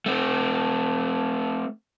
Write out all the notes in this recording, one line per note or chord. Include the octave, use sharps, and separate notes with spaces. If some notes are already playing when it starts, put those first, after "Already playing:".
A3 C4